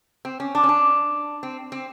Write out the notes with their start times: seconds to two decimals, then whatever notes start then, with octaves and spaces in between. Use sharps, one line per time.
0.25 C4
0.40 C#4
0.55 D4
0.63 C#4
0.69 D4
1.43 C4
1.72 C4